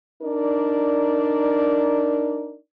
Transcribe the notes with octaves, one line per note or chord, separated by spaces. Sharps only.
D4 D#4 A#4 D5